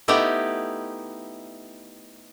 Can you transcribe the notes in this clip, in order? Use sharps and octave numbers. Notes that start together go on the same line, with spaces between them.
A3 B3 D#4 E4 G4